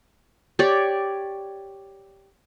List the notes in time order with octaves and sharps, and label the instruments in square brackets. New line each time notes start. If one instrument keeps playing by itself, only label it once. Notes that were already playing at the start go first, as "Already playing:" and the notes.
[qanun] G4 C#5 D5